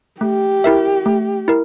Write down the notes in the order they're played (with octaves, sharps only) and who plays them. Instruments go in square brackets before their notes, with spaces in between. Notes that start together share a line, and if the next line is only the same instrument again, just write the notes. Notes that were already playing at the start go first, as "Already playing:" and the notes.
[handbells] A3 [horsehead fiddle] G4
[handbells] E4 A#4 E5
A3
E4 A#4